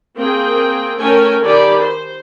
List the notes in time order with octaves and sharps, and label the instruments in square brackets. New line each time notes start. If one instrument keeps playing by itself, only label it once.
[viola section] A#3 C4 G#4 G5
A3 C#4 A4 A#4 G5 G#5
D#3 G4 A4 D5 G#5 B5
C5